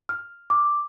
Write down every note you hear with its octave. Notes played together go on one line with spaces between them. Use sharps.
F6
D6